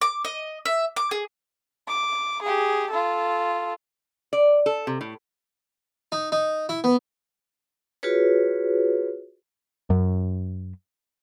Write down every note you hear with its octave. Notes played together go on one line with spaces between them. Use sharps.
D6
D#5
E5
D6
G#4
D6
G4 G#4
F4 A4
D5
A4
C3
A2
D#4
D#4
E4
B3
F4 F#4 G#4 B4 C#5
F#2